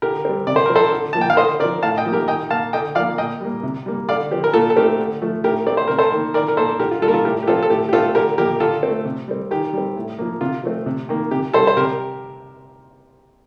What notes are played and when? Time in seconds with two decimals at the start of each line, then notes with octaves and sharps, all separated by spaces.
0.02 D3 G4 A#4
0.25 G3 C4
0.47 C3 D5
0.56 C5
0.66 F3 C4 A#4
0.75 A4 C5
0.92 D3
1.13 F3 A#3 A5
1.21 G5
1.30 F5
1.37 D3 C5 D#5
1.60 C4 A#4 D5
1.64 F3
1.83 A2 F5 A5
1.97 D#5 G5
2.05 F3 A#3
2.13 G4 A#4
2.28 D#3 D#5 G5
2.50 A#3 F5 A5
2.73 D3 D#5 G5
2.95 F3 D5 F5
2.98 A#3
3.18 A#2 D#5 G5
3.41 G3 A#3
3.63 C3
3.86 G3 A#3
4.09 D3 D5 F5
4.31 F3 C4 G4
4.44 A#4
4.54 A#2 F4 A4
4.70 A4
4.76 A3 C4 G4 A#4
4.99 D3
5.22 F3 A3
5.44 A2 G4 A#4
5.67 A3 C4 D5
5.77 C5
5.88 C3 A#4
5.99 A4 C5
6.12 D#3 A#3
6.34 D#3 A#4 D5
6.48 A#4
6.57 A#3 A4 C5
6.80 D3 G4 A#4
6.91 F4
7.02 G3 F4 A4
7.06 A#3 A#4
7.14 F4 A4
7.25 A2 G4 A#4
7.43 G4
7.47 F3 C4 F4 A4
7.63 A4
7.70 A2 G4
7.89 G4
7.93 A3 C4 F4 A4
8.15 D3 G4 A#4
8.38 F3 A#3 G4 A#4
8.60 D3 F4 A4
8.83 A3 C4
9.05 C3
9.28 G3 C4
9.51 D#3 G4
9.73 G3 C4
9.96 A2
10.18 F3 A#3
10.41 C3 F4
10.64 F3 A3 C4
10.86 C3
11.09 D#3 A#3
11.31 C3 G4
11.53 G3 C4 A4 C5
11.67 C5
11.77 C3 G4 A#4